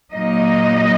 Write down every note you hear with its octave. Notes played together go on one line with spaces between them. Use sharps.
A#2 F#3 A#3 D#4 D#5